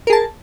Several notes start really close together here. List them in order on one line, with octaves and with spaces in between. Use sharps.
A#4 G#4 A5